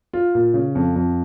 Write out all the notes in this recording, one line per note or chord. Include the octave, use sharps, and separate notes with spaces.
F4
A#2
C#3
F2
F2